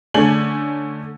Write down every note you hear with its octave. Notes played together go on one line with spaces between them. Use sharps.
D3 A3 C#4 G#5 F#7